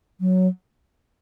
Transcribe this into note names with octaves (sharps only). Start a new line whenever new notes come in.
F#3